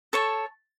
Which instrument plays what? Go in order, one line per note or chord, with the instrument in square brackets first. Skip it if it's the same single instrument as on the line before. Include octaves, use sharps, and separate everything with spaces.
[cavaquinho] A4 C#5 A5 C#6